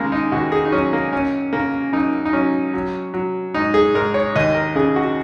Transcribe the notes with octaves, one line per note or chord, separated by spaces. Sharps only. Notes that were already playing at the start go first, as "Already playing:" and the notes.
Already playing: D#2 C#3 G#3 A#3
D#4
D#2 F#4
G#4
D#4
F#3 C#4
A#3
F#2 C#4
C#3 A#3
F#2 D#4
D#4
F#3 C#4
F#3
F#3
G#2 D#4
G#4
G#2 A#4
C#5
D#2 D#5
A#4
C#3 G#4
F#4